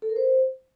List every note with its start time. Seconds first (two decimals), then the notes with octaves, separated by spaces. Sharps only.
0.02 A4
0.09 A#4
0.16 C5